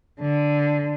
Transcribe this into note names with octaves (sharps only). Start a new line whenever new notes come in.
D3